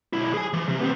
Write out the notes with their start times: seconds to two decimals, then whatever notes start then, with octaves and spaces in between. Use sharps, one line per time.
0.13 B1 E4
0.34 G#4 G#5
0.53 E3
0.68 C3
0.80 B3 C4